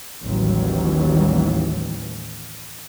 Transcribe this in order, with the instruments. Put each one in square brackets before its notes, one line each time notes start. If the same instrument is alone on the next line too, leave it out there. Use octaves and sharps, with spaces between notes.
[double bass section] A1 D#2 E3 F#3 G3